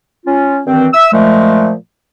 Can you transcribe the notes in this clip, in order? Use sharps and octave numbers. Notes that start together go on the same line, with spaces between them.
C#4 F4
G2 D#3 E3 C4
E5 E6
A#2 F3 G#3 A3